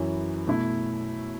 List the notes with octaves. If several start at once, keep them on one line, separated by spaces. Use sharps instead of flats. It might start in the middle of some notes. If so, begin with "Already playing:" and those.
Already playing: F#2 E3 C#4 E4
B2 A3 E4